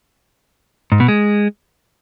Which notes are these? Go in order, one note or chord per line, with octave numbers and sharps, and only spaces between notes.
G#2
B2
G#3